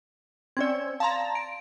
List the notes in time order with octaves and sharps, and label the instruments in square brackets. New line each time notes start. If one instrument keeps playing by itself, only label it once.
[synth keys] C4 C#4 E6 [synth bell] D5 G#6
[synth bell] F5 C6 [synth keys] A5 A#5
[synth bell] D7